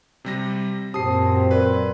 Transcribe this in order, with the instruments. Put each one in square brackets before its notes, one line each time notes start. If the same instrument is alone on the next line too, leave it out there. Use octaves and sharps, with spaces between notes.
[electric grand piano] C3 G3 A#6
[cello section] F#2 A#2 F#3 [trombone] C4 [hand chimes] G4 A5 [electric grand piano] D#6 C7
[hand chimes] A#4 D5 C6 [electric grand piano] B4